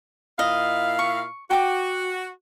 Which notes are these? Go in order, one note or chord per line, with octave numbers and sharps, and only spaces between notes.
A#2 E4 D#5 F5
C#6
F#4 G5 D6